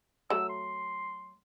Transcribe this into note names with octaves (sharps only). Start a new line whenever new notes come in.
F#3 A3 E6
C6